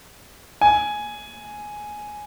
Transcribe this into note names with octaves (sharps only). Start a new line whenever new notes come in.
G#5